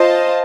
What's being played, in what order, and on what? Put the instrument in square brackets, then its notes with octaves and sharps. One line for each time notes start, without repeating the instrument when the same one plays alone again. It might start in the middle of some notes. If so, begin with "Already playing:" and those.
Already playing: [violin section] F4 C5 D#5 A5